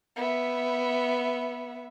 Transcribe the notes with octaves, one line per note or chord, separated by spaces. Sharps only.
B3 E5